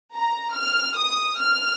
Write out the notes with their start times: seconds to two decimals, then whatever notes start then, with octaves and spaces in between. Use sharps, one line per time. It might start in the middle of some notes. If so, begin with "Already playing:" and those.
0.14 A#5
0.57 F6
0.98 D#6
1.40 F6